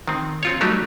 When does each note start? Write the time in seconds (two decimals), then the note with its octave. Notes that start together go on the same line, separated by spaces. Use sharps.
0.08 D#3 C4
0.43 C4 F4 C#5
0.61 F#3 G3 A3 D#4 G4